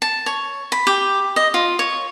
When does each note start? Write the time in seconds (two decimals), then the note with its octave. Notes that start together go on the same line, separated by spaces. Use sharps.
0.02 A5
0.26 C#5
0.72 B5
0.87 G4
1.36 D#5
1.54 F4
1.79 C#5